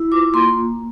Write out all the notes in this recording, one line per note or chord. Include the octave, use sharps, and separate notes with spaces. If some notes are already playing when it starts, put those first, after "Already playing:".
Already playing: E4
F4 D6
A#3 C6